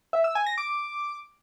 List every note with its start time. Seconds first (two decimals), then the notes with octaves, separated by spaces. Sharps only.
0.13 E5
0.24 E6
0.35 G#5
0.46 A#6
0.58 D6